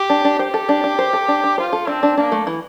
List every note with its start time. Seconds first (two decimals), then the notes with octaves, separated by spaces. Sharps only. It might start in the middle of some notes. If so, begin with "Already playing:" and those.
Already playing: G4
0.10 D4
0.25 D4
0.39 G4 C5
0.54 A4
0.69 D4
0.84 D4
0.99 C5
1.13 A4
1.28 D4
1.44 D4
1.58 F4 C5
1.73 A4
1.87 C4 D4
2.03 D4
2.17 A#3 D4
2.32 A3
2.47 E3